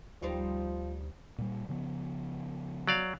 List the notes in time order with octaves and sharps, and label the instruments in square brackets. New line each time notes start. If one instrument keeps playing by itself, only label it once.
[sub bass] D2 [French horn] F3 [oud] G3 D#4 C5
[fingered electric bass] A#2 G3
C#3 F3 B3
[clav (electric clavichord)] F#3 D5 F5